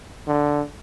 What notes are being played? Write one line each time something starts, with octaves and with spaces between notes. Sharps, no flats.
D3